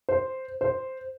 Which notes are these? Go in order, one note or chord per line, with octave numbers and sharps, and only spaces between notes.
C5
C5